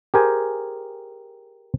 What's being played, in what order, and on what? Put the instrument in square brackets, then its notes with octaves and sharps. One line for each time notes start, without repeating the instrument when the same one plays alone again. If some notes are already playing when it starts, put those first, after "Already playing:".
[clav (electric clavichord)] G4 G#4 A#4 C5 G5 G#5